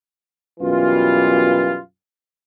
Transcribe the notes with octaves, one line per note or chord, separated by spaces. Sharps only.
F#2 B2 E3 G3 F4